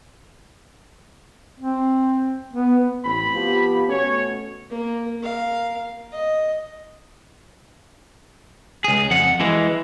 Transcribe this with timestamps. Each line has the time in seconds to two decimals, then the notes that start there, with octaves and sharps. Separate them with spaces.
1.60 C4
2.53 B3
3.04 A1 C4 B5
3.34 F3 B3 G4
3.88 B2 A3 C#4 C#5
4.70 A#3
5.20 A#4 F5
6.12 D#5
8.84 C#2 G#4
9.11 F2 F#5
9.40 E3 G#3